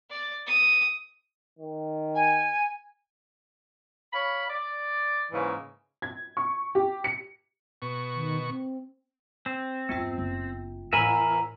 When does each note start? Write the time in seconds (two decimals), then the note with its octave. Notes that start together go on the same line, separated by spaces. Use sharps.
0.10 D5
0.47 D#6
1.59 D#3
2.15 G#5
4.13 C#5 F5 B5
4.49 D5
5.32 G#2 C#3 E3 A#3
6.02 G#6
6.37 C#6
6.75 G4
7.04 C#7
7.82 B2 C#6
8.15 D#3
8.48 C4
9.46 C4
9.89 E2 G2 B3 F4 G5
10.18 F#1
10.93 E2 A2 E4 A#4 E5 G#5 B5